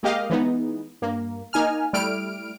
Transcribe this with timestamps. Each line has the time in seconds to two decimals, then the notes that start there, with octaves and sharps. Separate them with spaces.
0.03 G#3 A#3 G4 D#5 F5
0.30 E3 G#3 B3 D#4
1.02 G2 A#3
1.53 A#3 D#4 G#5 F6
1.93 G3 A3 E4 F6 D7